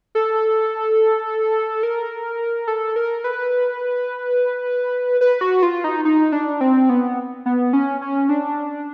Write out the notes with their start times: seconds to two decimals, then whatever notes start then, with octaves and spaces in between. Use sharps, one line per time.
0.15 A4
1.83 A#4
2.67 A4
2.96 A#4
3.24 B4
5.21 B4
5.41 F#4
5.63 F4
5.84 D#4
6.05 D#4
6.32 D4
6.61 C4
6.89 B3
7.46 B3
7.73 C#4
8.02 C#4
8.29 D4